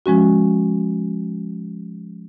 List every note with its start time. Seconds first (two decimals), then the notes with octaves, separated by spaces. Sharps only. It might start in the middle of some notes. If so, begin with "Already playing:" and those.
0.06 F3 G#3 C#4 F#4